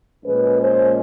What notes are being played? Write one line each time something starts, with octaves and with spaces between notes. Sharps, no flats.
A#2 F3 G#3 C#4 B4
C5